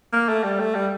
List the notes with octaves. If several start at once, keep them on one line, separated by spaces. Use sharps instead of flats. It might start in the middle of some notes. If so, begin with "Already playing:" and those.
A#3
A3
G3
A3
G3